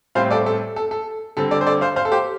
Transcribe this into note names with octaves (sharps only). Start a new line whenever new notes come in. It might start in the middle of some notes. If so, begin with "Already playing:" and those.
A2 G3 C4 C5 F5
A4 D5
A4
A4
A4
D3 G3 C4 A4
A4 D5
C5
A4 D5
C5 F5
C5 F5
A4
G4 C5